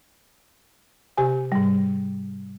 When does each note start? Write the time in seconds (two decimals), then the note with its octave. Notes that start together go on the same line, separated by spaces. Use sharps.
1.18 C3 G4 G#5
1.52 G#2 G3